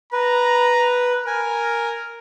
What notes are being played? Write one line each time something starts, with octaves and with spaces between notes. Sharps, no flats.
B4 A#5
A#4 G#5